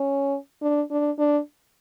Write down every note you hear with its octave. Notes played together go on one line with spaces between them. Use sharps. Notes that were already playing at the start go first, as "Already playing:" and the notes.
Already playing: C#4
D4
D4
D4